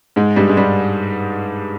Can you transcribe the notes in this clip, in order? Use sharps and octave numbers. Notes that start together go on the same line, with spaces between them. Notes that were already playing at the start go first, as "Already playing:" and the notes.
G#2 G#3
G2 G3
G#3
G2 G3